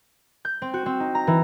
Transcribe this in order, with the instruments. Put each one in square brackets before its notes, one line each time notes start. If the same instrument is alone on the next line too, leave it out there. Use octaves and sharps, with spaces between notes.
[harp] G6
C4
F#4
C4
D#4
A#5
E3